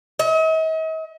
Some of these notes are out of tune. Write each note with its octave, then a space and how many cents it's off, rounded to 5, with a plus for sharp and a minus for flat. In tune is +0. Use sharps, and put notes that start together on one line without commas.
D#5 +45